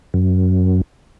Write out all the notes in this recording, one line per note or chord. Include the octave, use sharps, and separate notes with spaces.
F#2